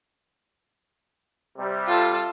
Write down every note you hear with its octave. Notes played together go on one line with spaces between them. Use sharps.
C3 G3
F4 A4